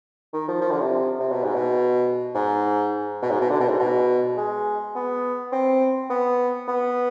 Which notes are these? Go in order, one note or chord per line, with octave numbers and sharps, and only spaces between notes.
D#3
F3
F3
D3
C3
C3
B2
G#2
B2
G#2
B2
G#2
B2
D3
B2
G#2
B2
G#3
B3
C4
B3
B3